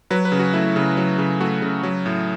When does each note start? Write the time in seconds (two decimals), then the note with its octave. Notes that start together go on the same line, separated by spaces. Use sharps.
0.11 F#3 B4
0.25 B4
0.32 C#3
0.39 F#4
0.53 A3 E4
0.76 C#3
0.97 F#3
1.18 C#3
1.40 A3 F#4
1.62 C#3
1.83 F#3
2.06 A2